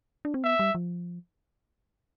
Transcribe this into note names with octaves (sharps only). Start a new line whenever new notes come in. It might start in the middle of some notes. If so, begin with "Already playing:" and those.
D4
C4
B3 E5
G3
F3